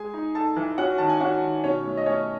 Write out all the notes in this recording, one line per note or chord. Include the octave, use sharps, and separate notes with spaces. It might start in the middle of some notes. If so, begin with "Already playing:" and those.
Already playing: G#3 G#4 G#5
D#4
D#4 A4 A5
E3
C#4 F#4 F#5
D#3 A5
G#5
C#4 F#4 F#5
D#3
B2 C#4 C#5
A3
D#5
A3 C#4 C#5